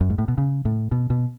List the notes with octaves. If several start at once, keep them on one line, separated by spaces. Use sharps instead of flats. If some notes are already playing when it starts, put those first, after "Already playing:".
F#2
G#2
A2
B2
C#3
A2
B2
B2